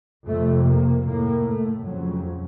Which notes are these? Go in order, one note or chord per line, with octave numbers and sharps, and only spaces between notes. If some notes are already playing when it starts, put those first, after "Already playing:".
F2 C3 A3
A#3
A2 A#3
A3
F2 C#3 F#3